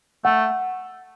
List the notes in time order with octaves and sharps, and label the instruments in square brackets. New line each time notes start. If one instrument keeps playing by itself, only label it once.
[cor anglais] A3 [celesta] F#5